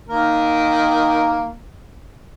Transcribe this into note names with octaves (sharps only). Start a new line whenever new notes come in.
D#3 A#3 A#4